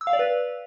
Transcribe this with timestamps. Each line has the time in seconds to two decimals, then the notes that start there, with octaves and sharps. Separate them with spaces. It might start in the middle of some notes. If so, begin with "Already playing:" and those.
0.01 E6
0.07 F5
0.13 D5
0.19 B4